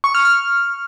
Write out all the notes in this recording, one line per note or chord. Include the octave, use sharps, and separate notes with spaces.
C#6
F6
F6